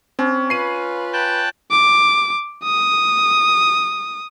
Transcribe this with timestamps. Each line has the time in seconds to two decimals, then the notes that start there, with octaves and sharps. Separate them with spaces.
0.19 C4 C#4
0.50 F4 B4 C7 D#7
1.13 G5 A5 F#6
1.71 D6
2.64 D#6